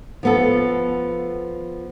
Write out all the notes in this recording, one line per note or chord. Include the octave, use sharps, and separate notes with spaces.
F3 B3 A4